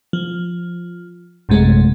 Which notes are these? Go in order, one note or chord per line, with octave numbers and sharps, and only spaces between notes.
F3
A1 F#2 C3 G#3 A3